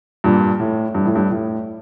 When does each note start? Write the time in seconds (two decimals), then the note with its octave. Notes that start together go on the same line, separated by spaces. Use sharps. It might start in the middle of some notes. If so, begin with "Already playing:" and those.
0.24 G2 A#2
0.59 A2
0.95 G2
1.05 A2
1.15 G2
1.30 A2